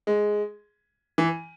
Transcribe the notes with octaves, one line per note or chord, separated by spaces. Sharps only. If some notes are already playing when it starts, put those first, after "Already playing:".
G#3
E3